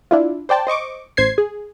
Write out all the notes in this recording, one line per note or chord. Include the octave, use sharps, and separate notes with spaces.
D4 E4 F4
C5 D5 G5 A5
C5 D#5 C#6 D6
A1 C5 G#6 C7
G#4